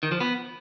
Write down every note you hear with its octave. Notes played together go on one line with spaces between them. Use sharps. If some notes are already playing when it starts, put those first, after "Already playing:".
D#3
F3
B3